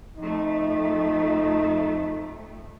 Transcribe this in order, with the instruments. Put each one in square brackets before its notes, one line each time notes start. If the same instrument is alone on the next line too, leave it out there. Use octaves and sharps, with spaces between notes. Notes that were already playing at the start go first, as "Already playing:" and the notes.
[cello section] F2 A3 [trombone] D#4